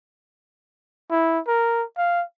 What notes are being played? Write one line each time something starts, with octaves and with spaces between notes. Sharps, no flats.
E4
A#4
F5